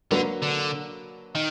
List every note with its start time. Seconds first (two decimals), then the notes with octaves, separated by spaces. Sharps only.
0.11 D3 F#3 A#3 D4 F#4 B4
0.42 D3
1.35 D#3 D#4